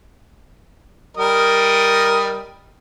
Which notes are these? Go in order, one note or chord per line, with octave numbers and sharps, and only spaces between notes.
G3 A#4 D#5